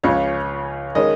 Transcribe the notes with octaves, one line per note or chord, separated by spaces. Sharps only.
C#2 C#3 F3 C#4 C#5
D#3 G#3 C#4 D#5